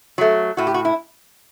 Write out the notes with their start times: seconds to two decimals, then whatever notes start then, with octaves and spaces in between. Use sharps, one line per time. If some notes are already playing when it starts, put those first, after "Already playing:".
0.18 F#3 A3
0.57 A2 F#4
0.67 G4
0.74 F#4
0.85 E4